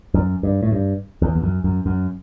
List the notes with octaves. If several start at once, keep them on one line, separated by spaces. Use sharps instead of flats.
F#2
G2
A2
G2
E2
E2
F#2
F#2
F#2